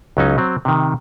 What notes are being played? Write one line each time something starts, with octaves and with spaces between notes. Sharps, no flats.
C#2 F#3 C#4 D#4
F#3 C4
C3 D#3